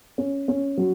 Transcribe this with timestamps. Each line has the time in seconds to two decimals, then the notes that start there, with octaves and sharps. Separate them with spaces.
0.18 C#4
0.48 C#4
0.77 F#3